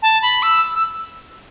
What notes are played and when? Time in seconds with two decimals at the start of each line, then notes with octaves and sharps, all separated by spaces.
0.02 A5
0.22 B5
0.43 E6
0.75 E6